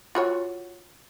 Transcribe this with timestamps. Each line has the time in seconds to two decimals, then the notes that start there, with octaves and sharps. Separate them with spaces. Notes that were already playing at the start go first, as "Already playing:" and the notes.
0.15 F4 F#4 C#5